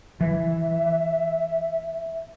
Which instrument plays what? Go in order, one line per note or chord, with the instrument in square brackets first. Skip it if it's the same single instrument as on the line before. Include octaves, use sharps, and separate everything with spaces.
[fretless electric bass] E3 [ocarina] E5